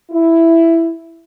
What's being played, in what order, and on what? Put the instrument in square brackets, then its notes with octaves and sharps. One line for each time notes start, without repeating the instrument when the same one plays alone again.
[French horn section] E4